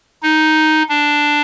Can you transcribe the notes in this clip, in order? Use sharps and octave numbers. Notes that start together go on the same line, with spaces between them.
D#4
D4